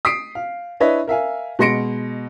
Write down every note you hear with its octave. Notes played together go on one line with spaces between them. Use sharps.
D#6 B6 C7 D7
F5
D4 E4 B4 C#5 D#5 E5
A#4 E5 F5 G#5
B2 G#3 C6 A#6 C#7 D7